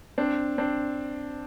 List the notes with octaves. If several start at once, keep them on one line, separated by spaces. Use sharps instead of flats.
C4 D4
C4 D4